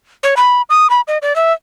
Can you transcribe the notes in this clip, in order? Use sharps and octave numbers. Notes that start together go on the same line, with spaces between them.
C#5
B5
D#6
B5
D#5
D5
E5